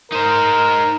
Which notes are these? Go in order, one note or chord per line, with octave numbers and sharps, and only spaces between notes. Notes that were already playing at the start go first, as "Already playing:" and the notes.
D#4 A#4 C5